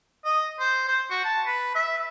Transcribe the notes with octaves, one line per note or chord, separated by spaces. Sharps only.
D#5
C5
C5
F#4
A5
B4
E5